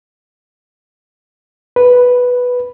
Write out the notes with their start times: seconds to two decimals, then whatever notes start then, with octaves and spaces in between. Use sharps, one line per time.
1.76 B4